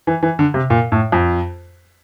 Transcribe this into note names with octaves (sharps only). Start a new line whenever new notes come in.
E3
E3
D3
C3
A#2
A2
F2